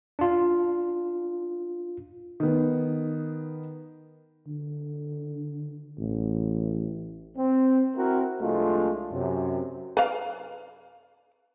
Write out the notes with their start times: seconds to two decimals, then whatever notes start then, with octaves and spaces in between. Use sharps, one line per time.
0.19 D4 F4
2.40 D#3 B3
4.47 D3
5.99 A1
7.37 C4
7.96 C4 E4 F#4 A#4
8.41 C2 F3 G#3 A3 D4 F4
9.12 F#2 C3
9.97 B4 D5 F5